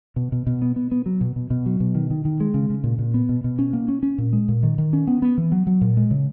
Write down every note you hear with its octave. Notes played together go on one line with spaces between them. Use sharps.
B2
B2
B2
B3
B3
B3
F#3
B2
B2
B2
F#3
B2
D#3
D#3
D#3
G#3
C#3
C#3
A#2
A#2
B3
B2
B2
C#4
A#3
C#4
C#4
A#2
G#3
A#2
D#3
D#3
C#4
B3
B3
E3
F#3
F#3
A#2
G#3
C#3